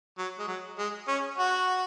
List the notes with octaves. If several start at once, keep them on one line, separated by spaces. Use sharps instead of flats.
F#3
G#3
F#3
G#3
C#4
F#4